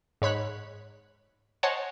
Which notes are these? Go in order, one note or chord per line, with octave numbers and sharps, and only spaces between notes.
G#2 C#5 B5 F#6
C5 C#5 D#5 F#5 G#5 A5